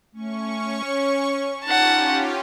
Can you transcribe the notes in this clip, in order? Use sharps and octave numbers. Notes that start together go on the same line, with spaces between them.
A3 C#4 C#6
C#5
C#4 D#4 F4 G4 F#5 A5